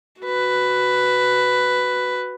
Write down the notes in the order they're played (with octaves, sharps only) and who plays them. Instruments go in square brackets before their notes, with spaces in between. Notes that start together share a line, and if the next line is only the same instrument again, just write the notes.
[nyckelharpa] F#4 B4